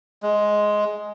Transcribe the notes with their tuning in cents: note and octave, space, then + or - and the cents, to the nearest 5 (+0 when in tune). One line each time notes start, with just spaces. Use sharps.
G#3 +10